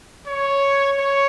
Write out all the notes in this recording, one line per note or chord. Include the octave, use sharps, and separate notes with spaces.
C#5
C#5